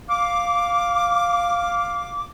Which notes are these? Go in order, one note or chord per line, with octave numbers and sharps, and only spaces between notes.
F5 D6